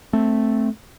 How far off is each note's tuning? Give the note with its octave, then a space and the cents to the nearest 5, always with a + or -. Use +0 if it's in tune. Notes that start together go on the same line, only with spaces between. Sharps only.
A3 +0 C4 +0